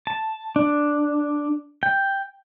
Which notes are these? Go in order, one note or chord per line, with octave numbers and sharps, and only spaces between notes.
A5
D4
G5